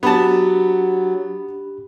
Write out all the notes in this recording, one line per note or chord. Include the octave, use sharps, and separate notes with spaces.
F#3 B3 D4 G4 A5 B5